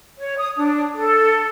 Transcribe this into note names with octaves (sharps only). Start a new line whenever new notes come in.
C#5
D#6
D4
A4